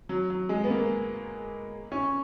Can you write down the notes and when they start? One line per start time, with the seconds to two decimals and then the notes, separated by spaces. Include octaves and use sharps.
0.09 F#3
0.30 F#3
0.49 G#3
0.64 B3
0.70 A#3
1.92 C#4